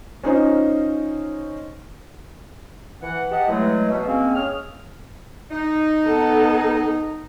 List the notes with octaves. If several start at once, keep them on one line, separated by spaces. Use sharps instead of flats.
C#4 D#4 F4 C5 D#5
E3 F#5
G4 D#5 F#5 A5
E3 F#3 G#3 A3
B2
G#3 A#3 C4 C#4
C#4 G#4 F6
D#4
B3 A4